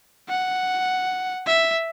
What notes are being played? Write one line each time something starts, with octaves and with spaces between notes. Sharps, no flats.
F#5
E5